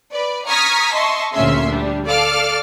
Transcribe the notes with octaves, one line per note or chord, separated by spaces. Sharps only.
B4 D5
A#5 C#6 D#6 F6 G#6 B6
D#5 E5 A5 C6 C#6
D2 A#2 C#3 C#4 E5 C6
G3 D4
A4 D5 F5 D6 F6